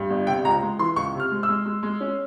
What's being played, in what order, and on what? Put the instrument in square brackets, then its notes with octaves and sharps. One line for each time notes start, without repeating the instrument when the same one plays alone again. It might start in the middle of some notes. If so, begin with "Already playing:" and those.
Already playing: [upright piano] G2
G1
C3 G5
C#2 A#5
G#3
E3 C6
C#2 C#6
C3
F6
G#3
E6
G#3
G#3
G#3
C#4